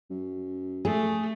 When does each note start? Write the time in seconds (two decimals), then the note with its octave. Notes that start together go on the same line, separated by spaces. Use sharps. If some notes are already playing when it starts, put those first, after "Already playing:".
0.10 F#2
0.85 A3 G#4